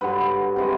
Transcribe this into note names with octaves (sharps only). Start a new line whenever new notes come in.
G2 D3 F#3 B4
C3 E3 G#3